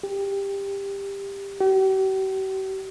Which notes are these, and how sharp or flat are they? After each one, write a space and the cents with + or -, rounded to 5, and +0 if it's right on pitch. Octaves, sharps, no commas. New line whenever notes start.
G4 +15
G4 -45